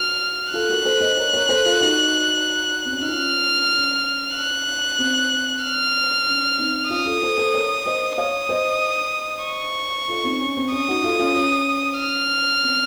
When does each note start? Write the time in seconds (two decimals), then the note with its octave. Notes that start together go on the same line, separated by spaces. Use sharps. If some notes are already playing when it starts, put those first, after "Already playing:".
Already playing: F#4 F6
0.53 F4 A4 F#6
0.69 F#4 A#4
0.85 A4 C5
1.01 C5 D#5
1.17 A#4 C#5
1.33 A#4 C#5
1.49 A4 C5
1.65 F4 A4
1.80 D#4 F#4
2.85 C4
2.92 C#4
3.00 D#4
3.08 C#4 F4 F6
3.72 C#4
4.36 F#6
4.98 C4
5.63 F6
6.26 C#4
6.58 C4 D#4
6.89 C#4 F4 D#6
7.06 F4 A4
7.22 A4 C5
7.38 A4 C5
7.54 A#4 C#5
7.86 C5 D#5
8.18 C#5 F5 D#6
8.49 C5 D#5
9.45 C#6
10.08 F4 A4
10.24 C4 D#4
10.41 C#4
10.57 C4
10.72 C#4 D#6
10.88 D#4 F#4
11.04 F4 A4
11.19 C#4 F4
11.36 C#4
11.99 F6
12.63 C4